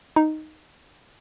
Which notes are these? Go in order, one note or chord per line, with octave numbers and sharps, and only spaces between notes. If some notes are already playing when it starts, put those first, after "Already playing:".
D#4